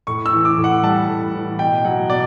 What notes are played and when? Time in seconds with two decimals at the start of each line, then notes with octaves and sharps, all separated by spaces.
0.07 A2 C#6
0.26 E6
0.33 E3
0.45 D6
0.57 A2
0.64 F#5
0.83 G3 A5
1.09 A2
1.34 E3
1.59 B2 G5
1.85 F#3 F#5
2.10 B2 D5